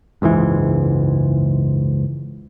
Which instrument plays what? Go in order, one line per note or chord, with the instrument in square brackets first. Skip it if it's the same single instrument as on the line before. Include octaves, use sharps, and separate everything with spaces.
[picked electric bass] F#1 C#2 G#2 E3